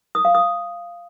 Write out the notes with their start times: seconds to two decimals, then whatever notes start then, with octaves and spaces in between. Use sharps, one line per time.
0.15 D#6
0.25 F5
0.35 D#6